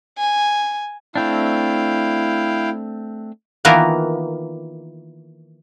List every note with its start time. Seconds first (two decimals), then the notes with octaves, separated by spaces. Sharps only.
0.18 G#5
1.16 A3 C4 D4 E4 F5 G5
3.65 D#3 E3 A#3 B3 F4 A#4